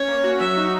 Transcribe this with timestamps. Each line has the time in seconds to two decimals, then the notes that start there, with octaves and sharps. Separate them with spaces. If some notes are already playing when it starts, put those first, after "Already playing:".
Already playing: C#4 C#5
0.08 A#3
0.24 F#4
0.40 F#3 E5
0.57 D#4